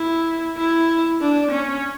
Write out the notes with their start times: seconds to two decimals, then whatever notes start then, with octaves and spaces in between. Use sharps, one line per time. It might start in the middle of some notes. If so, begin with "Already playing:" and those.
Already playing: E4
0.57 E4
1.21 D4
1.52 C#4